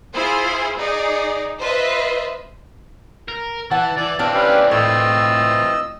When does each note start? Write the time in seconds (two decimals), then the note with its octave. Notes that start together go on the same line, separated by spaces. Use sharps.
0.14 E4 F4 G#4 C5 G#5
0.77 D#4 G#4 D5 D#5
1.60 F4 B4 C5 D#5 E5
3.28 A#4
3.71 E3 F#5 A5
3.97 E3 D5
4.19 E3 C4 D4 F5
4.35 C#4 G4 B4 F5
4.71 A2 F4 D#5 E6